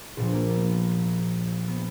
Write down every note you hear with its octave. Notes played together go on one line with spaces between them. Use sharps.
A#1 A#2 F3 B3
A#3
B3
B3
B3